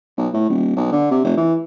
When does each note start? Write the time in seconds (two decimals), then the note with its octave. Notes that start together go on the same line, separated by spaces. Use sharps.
0.17 B1
0.34 A2
0.49 D#1
0.76 B1
0.92 D3
1.11 C3
1.24 F1
1.37 E3